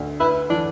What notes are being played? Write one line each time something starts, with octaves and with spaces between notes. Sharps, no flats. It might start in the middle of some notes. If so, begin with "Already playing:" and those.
Already playing: D2
E4 B4
E3 D4